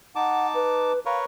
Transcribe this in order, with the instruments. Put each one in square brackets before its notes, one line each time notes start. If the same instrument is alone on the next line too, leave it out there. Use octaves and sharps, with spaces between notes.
[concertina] D#4 A5 D6 [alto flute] F#5
[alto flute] B4
[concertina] A#4 B4 C#5 [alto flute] F5